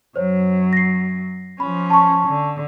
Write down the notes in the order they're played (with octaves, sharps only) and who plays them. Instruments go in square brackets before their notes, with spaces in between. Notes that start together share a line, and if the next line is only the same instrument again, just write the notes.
[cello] F#2 F#3 [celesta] C5 C#5
[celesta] A#6 C7
[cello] F3 C#4 [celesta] B5
[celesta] A5 C#6
[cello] D3